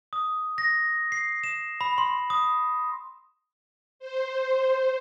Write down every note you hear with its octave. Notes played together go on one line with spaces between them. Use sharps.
D#6
A#6
C7
E7
B5
C6
D#6
C5
C5